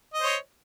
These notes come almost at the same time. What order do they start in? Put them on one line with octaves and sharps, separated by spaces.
D#5 C5 C#5